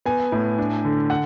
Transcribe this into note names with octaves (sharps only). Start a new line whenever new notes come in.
B3 G#5
A2
D4
D3
F#5